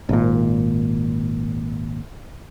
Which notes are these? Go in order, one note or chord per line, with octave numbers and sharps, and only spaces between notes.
G#1 A#2